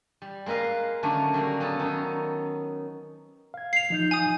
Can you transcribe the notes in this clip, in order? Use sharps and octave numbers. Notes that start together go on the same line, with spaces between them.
G3
G#3 A#3 A#4 B4 F5
D3 D#3 F#3 A3 C#4 D4
F#3 G3 A#3
B3 C#4 A4 A5
D#3 C#4 D#4
F5 G#6
C7 F7
F3 D#4 G6
G#5 D#6